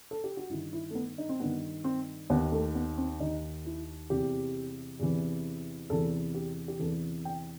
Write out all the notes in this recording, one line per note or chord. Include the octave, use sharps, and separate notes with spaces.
A4
G4
F#4
G2 D#3 E4
E4
A3
B3
D#4
C4
G2 D#3 B3
C4
D#2 D#3 B3
A3
B3
C4
D#2 D#3 D#4
E4
E2 C3 E3 G4
E2 C3 E3
E2 C3 E3 A4
G4
G4
E2 C3 E3 A4
G5